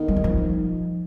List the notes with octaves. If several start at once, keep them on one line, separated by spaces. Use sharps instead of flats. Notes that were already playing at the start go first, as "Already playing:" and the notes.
Already playing: D#3 B3
G3
F#3
F3